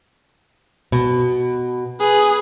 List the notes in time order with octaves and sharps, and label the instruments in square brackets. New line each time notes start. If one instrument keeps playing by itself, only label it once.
[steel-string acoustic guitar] B2
[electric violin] G#4 B4